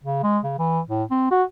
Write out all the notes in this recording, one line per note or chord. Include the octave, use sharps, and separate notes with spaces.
C#3
G#3
C#3
E3
A2
C4
F#4